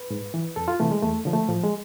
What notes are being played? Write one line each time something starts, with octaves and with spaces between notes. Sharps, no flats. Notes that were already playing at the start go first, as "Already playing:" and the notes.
Already playing: B4
G#2
E3
F2 A4
F4
C3 E3 A3
G#3
E2 A3
D3 F3
A3
A2 F3
G#3